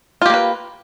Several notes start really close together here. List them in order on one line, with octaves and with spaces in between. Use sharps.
F4 G4 A#3 B4